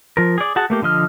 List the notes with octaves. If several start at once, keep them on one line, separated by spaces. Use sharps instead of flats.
F3 A#4
G#4 D5
F#4 G#4 F#5 A5
A3 A#3 G4
D3 F3 D#5 F6